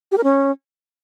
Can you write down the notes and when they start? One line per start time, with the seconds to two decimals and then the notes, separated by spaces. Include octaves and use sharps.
0.11 G4
0.17 A#4
0.23 C#4